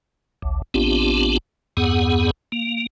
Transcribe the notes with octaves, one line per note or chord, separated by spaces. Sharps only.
A1 D2
A1 B3 C4 D4 F4 G4
E2 G2 B3 G#4 F#5
A#3